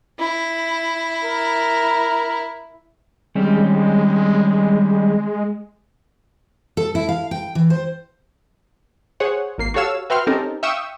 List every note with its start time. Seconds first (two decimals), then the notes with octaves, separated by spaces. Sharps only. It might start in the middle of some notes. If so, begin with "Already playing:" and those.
0.19 E4
1.23 A#4
3.35 D#3 G3 G#3 C4 C#4
6.77 A4
6.95 E4
7.09 F5
7.31 G5
7.55 E3
7.70 C5
9.20 G#4 C5 C#5 F#5
9.58 G#1 A#3 C7
9.74 F#4 G4 A4 C#5 F5 E6
10.10 F#4 B4 E5 G5 C6 F6
10.27 C4 C#4 D#4 G4 A4 A#4
10.63 E5 F5 G5 C#6 D#6 E6